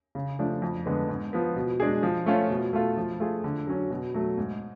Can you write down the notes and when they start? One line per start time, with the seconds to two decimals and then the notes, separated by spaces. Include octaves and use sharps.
0.15 C#3
0.39 F3 A3 D4
0.62 F2
0.86 D3 G#3 B3
1.09 G#2
1.33 F3 B3
1.56 B2
1.80 G#3 D4 G#4
2.03 F3
2.26 A3 C#4 F4
2.50 B2
2.73 A3 F4 A4
2.97 F3
3.20 A3 F4 G#4
3.44 D3
3.67 F#3 C#4
3.90 B2
4.14 F#3 A3
4.38 G#2